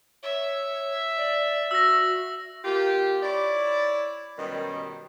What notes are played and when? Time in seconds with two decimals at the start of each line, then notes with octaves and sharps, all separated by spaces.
0.23 C#5 E5
1.17 D5
1.71 F#4 E6 A#6
2.65 A#3 F4 G4
3.22 E4 C#5 D5
4.38 F#2 B2 D#3 G3